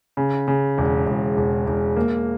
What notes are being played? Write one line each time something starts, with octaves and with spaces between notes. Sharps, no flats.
C#3
C#3
E1
E1
E1
E1
A#3